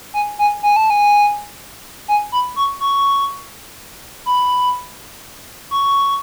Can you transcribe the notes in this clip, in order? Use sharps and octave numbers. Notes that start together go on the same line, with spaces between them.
G#5
G#5
G#5
A5
G#5
G#5
B5
C#6
C#6
B5
C#6